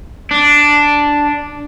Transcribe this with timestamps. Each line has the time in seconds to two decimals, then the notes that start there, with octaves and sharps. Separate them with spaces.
0.31 D4